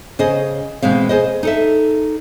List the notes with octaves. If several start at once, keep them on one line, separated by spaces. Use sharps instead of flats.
C#3 G#4 C5 D#5
B2 E3 G#3 C4 F5
G#4 C5 D#5
D#4 A4 E5